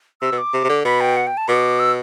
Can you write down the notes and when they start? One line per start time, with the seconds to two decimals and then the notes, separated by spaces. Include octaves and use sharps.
0.22 C3 E6
0.32 B2
0.38 D6
0.53 C3
0.64 C3
0.69 D3
0.85 B2 B5
1.01 G5
1.16 F#5
1.27 G5
1.37 A5
1.48 B2 D6
1.79 E6